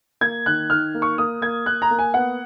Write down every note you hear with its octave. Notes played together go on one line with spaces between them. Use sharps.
A#3 G#6
D#3 F#6
D#3 F6
A#3
C#6
A#3 D#6
A#3 G#6
A#3 F#6
A#5
A#3
G#5
B3 F#5